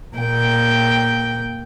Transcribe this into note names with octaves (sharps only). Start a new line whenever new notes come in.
A#2 G5